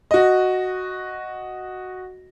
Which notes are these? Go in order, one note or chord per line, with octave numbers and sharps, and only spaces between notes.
F#4 D#5